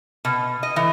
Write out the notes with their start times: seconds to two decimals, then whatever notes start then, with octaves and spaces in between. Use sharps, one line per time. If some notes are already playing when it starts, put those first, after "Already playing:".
0.25 B2
0.63 D#5
0.76 E3